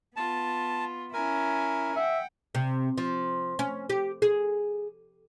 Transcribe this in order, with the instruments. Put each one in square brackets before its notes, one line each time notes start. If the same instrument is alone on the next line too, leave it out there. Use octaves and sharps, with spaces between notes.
[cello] B3 [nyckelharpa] F4 [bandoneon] A5
[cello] C#4 E4 [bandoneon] A#4 [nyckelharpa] G#5
[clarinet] E5 [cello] F#5 G5
[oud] C3
F3
C#4
G4
G#4